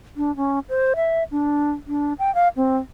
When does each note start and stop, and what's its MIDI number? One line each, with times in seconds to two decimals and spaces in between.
0.17 0.35 62
0.37 0.59 61
0.69 0.93 72
0.96 1.23 76
1.31 1.71 62
1.88 2.14 62
2.19 2.33 79
2.35 2.48 77
2.56 2.78 60